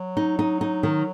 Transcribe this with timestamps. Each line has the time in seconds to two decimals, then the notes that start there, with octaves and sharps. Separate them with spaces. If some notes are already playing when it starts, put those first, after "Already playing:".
Already playing: F#3
0.17 D#4
0.39 D#4
0.61 D#4
0.83 D#3